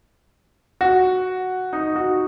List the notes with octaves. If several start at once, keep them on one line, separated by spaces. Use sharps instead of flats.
F#4
D#4
F#4